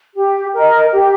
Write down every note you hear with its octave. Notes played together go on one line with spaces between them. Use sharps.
G4
A#4 D#5
G4